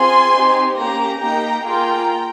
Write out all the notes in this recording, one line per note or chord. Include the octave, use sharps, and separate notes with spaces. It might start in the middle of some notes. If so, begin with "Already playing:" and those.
Already playing: C4 F4 G#4 G#5 C6
C4 D#4 G4
A#3 C#4 G4 G5 A#5
A#3 D#4 G4 G5 A#5
A#3 F4 G#4 G5 A#5